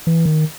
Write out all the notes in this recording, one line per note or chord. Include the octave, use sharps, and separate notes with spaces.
E3
D#3